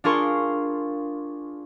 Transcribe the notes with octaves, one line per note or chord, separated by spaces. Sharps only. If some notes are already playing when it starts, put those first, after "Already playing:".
D4 F4 G#4 A#4 C6 C#6